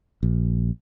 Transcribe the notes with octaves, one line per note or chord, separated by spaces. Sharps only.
A#1